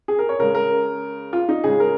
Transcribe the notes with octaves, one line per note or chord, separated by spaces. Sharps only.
G#4
A#4
C#5
C#3 G#3 A#4
A#4
F4
D#4
C#3 G#3 G#4
A#4